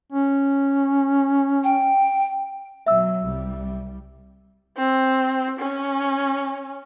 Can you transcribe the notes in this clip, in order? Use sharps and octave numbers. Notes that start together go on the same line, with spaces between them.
C#4
G5
B2 F#3 E5 E6
C2 G3
C4
C#4